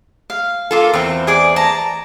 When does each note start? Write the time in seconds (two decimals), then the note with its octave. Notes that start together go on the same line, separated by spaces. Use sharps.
0.30 F5
0.71 A#3 F4 A4
0.93 E2 C4
1.27 G#4 D5
1.56 A5 A#5